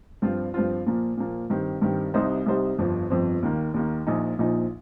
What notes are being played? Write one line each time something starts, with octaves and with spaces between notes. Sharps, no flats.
G2 F3 C4 F4
G2 F3 C4 F4
A#2 F3 A#3
A#2 F3 A#3
G2 D#3 C4 G4
G2 D#3 C4 G4
C2 C3 G3 D#4 C5
C2 C3 G3 D#4 C5
G1 F2 F3 C4
G1 F2 F3 C4
D#2 D#3 A#3
D#2 D#3 A#3
A#1 A#2 F3 D#4
A#1 A#2 F3 D#4